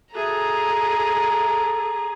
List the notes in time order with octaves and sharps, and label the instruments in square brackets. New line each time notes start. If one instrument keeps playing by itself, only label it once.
[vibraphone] F#4 E5 [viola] G#4 [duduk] A4 [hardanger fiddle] A#5